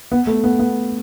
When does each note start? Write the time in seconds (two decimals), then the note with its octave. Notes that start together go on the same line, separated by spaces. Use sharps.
0.12 B3
0.27 A3
0.44 B3
0.59 B3